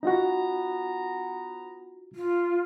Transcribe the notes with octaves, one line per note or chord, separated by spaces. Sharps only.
B3 D#4 F4 F#4 A#5
F4